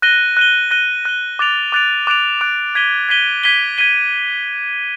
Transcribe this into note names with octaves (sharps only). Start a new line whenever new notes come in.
F#6 A#6 D#7 G7
F#6 A#6 D#7 G7
F#6 A#6 D#7 G7
F#6 A#6 D#7 G7
D6 F#6 A6 D7 F7
D6 F#6 A6 D7 F7
D6 F#6 A6 D7 F7
D6 F#6 A6 D7 F7
G#6 B6 D#7 G7
G#6 B6 D#7 G7
G#6 B6 D#7 G7
G#6 B6 D#7 G7